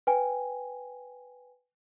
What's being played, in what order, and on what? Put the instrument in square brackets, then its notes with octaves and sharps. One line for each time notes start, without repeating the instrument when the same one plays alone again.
[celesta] B4 G5 G#5